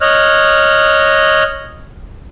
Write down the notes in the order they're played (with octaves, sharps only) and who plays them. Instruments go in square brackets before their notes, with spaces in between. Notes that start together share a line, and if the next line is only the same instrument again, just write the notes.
[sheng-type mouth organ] C#5 D#5 F6 F#6